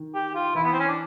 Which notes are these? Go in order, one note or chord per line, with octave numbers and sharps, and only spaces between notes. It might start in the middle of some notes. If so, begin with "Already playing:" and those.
Already playing: D#3
G4
F4
E3 E4
B3
C4
C#4
D4